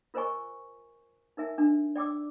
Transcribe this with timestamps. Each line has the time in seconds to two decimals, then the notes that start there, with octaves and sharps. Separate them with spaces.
0.14 F4 A#4 C5 D#5 G#5 C#6
1.37 D#4 A#4 E5 G#5
1.58 D4
1.96 D5 G5 D6 E6